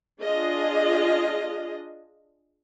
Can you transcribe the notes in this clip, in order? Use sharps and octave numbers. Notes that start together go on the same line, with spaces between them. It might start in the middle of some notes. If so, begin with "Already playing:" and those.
D4 F4 G#4 D#5